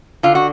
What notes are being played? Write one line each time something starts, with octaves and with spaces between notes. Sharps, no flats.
D3 F4
F#4